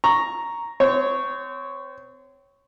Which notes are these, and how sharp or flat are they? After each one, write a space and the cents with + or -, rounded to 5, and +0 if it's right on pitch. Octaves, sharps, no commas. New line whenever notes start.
A#5 +0 C#6 +0
C4 -30 C#5 +0